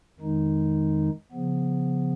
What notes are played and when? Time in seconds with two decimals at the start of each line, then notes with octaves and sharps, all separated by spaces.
0.20 F2 D#3 G#3 D#4
1.32 C#3 F3 B3